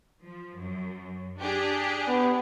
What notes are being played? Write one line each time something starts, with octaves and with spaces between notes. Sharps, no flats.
F3
F#2
D4 G4 G#4
B3